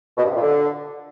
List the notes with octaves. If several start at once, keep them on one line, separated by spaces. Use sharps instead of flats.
B2
G2
C3
A#2
D3